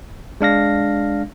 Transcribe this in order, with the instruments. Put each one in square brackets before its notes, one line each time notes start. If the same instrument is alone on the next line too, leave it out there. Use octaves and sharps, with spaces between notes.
[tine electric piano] G#3 D4 F5 A#6